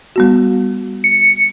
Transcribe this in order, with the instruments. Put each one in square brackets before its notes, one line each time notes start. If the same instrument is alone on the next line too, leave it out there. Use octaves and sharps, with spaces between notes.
[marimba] G3 B3 F#4
[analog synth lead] C#7